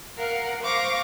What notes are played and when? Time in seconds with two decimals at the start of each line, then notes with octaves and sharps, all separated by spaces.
0.18 A#4 F5 F#5
0.63 C5 F5 C#6 D6 A#6